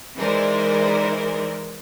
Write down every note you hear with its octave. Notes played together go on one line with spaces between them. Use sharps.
E3 G#3 D#4 A#4 C5 D5